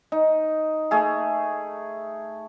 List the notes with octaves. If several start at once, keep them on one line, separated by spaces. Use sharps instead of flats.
D#4
A3 G#4